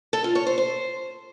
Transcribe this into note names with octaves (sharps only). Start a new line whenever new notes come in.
A4
F4
C#5
C5
C5